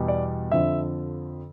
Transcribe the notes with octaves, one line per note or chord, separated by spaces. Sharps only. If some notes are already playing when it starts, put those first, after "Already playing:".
Already playing: E2 B2 G3
D5
F2 D3 F3 E5